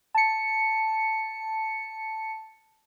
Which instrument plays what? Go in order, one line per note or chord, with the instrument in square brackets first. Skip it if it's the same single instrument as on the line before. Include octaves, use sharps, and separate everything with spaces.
[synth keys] A5 C#7